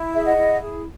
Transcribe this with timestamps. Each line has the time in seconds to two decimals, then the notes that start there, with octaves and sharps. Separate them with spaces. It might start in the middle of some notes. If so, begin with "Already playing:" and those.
Already playing: E4
0.14 G#4 E5
0.25 D#5 F#5
0.37 E4
0.61 G#4